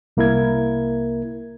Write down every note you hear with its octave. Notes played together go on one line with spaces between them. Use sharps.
C2 A#3 E4 A#4 G#6